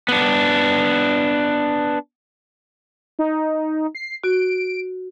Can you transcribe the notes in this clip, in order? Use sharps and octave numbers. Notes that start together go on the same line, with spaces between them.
B3 D4
D#4
C7
F#4 D7